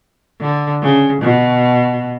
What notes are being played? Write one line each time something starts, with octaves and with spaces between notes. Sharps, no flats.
D3
C#3
B2